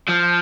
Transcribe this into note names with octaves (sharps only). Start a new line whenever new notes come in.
F3